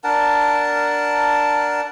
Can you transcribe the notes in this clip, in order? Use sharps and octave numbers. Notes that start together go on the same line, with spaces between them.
D4 A#4 F#5 A5